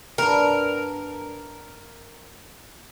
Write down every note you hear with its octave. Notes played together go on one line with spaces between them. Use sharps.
G2 B3 D4 A#4